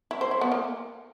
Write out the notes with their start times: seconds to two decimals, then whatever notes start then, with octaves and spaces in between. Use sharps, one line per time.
0.11 E4
0.21 C5
0.31 E4
0.41 B3
0.52 A#3